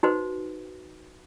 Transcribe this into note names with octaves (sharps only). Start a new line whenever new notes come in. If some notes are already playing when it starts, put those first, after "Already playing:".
D#4 F#4 B4 C5